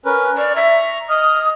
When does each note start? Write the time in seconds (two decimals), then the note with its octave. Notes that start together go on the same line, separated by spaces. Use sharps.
0.05 C#4 A#4 B4
0.37 D5 C#6 F6
0.56 E5 A#5 C#6
1.09 D#5 D#6 F6